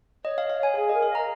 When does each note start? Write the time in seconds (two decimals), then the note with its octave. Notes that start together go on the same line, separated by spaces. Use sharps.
0.24 C#5 D#5
0.38 F5
0.50 F5
0.63 G#5
0.75 G#4 G#5
0.89 A#4 D#5
1.02 F5
1.10 D#5
1.15 A#5